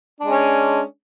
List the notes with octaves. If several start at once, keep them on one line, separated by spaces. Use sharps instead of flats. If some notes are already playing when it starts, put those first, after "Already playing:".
G#3 C#4 D4